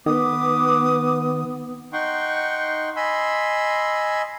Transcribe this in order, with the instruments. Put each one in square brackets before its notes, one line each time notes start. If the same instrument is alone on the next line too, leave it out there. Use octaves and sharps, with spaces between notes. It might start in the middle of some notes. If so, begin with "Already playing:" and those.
[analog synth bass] D#3 [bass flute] B3 [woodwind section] B4 D6 [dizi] D#6
[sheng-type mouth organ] D#4 F#5 G5 C6 C#6
D#5 G#5 B5 C6 E6